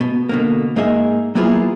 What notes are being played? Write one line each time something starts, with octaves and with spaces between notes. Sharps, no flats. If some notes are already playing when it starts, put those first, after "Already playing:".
B2
B2 D3 A#3
G#2 A#3 D#4 G#4 E5
F#3 A#3 B3 E4 F4 G#4